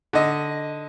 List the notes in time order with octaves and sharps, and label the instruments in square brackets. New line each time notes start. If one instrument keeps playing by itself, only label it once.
[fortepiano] D3 D#5